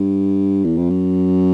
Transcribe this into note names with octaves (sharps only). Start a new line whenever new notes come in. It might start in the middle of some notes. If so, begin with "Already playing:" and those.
Already playing: G2
E2
F2
F#2